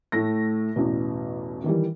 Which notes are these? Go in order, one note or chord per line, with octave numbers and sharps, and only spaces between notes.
A2 A3 A#6
A1 E2 B2
D#3 E3 G3